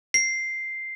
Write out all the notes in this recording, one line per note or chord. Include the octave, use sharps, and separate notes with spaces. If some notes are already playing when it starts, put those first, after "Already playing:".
C7